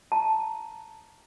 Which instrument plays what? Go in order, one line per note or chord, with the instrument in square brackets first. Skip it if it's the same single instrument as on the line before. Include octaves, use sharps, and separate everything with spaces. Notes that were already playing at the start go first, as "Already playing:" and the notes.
[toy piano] A5 A#5